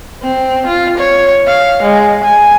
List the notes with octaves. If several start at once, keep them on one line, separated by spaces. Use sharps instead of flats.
C4
F4
C#5
F5
G#3
G#5